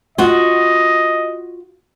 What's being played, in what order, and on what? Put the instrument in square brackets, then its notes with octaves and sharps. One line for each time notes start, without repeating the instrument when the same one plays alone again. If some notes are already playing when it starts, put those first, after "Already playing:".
[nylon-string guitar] F4 F#4 [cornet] D#5